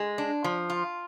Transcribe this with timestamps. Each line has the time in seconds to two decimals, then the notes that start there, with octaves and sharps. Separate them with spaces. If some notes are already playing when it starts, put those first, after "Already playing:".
Already playing: G#3
0.18 D4
0.44 F3
0.70 F4